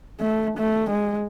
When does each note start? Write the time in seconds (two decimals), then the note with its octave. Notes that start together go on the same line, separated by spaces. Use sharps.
0.20 A3
0.58 A3
0.90 G#3